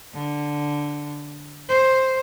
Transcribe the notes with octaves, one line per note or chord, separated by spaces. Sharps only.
D3
C5